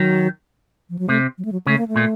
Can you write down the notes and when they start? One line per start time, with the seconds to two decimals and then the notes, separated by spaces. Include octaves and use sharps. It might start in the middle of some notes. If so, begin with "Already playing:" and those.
Already playing: D#3 F#3
0.90 F3
0.99 F#3
1.09 C3 A3
1.38 F#3
1.45 A3
1.52 F#3
1.66 C#3 A3
1.78 A#3
1.88 A3
1.96 A#2